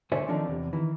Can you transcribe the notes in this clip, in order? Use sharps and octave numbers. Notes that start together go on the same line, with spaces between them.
D2 D3 C5 C#5 E5 G#5
D3 D#3 F3 C4 D4 D#4
E2 C3
D#3 E3